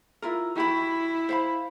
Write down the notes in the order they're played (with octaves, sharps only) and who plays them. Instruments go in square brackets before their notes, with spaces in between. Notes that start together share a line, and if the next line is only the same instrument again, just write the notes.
[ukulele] E4 F4 A#4
[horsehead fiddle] E4 [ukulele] F#4 G4 B5
[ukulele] C5 F5 B5